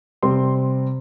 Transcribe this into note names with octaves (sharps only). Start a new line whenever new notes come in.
C3 G3 C4 C6